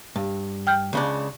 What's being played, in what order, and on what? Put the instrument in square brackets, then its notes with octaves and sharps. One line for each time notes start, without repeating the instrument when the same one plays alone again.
[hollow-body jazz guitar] G2
[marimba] G5 F6 G6
[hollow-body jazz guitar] C#2 C#3 D4